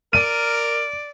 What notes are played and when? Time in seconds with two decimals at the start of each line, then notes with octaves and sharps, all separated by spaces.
0.13 A#4 D5 D#7